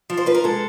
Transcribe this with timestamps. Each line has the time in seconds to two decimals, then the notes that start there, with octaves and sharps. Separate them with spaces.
0.10 F3
0.17 C5
0.26 F3 B4
0.35 A#4
0.44 G#3 A4